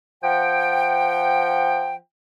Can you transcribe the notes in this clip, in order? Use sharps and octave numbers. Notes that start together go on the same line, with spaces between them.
F3 F#5 G5